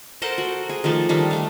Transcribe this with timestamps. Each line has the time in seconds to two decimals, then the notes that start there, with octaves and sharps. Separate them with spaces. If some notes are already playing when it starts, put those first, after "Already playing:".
0.22 A4 A#4 C5 F#5
0.38 F#4
0.69 G#4
0.84 D#3 F3 A3 A4
1.09 D#3 G3 A3 D4
1.31 A3 F5